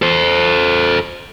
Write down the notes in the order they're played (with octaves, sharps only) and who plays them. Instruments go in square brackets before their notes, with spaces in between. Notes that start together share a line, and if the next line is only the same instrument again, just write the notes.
[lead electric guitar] A4 C5